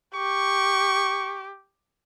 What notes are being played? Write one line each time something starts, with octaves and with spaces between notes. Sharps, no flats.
G4 C#6